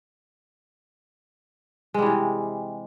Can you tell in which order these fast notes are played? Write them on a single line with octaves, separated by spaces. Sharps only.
G#3 G3 E3 C3